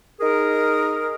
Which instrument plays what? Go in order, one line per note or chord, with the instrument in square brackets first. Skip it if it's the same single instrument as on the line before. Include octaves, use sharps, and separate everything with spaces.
[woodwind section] D#4 G#4 A#4